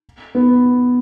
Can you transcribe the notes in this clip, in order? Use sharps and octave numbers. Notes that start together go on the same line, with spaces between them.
B3